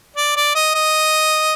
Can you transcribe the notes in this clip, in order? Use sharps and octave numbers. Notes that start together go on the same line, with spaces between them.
D5
D5
D#5
D#5